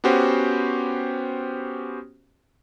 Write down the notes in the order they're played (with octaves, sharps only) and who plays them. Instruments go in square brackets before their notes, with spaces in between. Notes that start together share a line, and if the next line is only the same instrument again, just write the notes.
[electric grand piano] B3 C#4 F#4 G4 C5